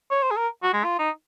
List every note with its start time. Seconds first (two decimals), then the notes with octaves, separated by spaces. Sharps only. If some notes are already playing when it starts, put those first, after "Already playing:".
0.11 C#5
0.22 C5
0.31 G#4
0.37 A#4
0.63 F#4
0.73 G#3
0.84 F4
0.99 D#4